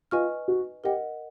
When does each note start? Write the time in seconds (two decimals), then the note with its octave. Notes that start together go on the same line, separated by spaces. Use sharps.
0.11 F4 B4 D#5 G#5 C#6 F6
0.48 F#4
0.84 G4 A#4 D#5 F#5